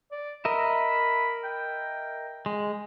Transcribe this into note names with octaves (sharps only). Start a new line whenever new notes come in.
D5
A#4 D#5 E5 B5
G5
G#3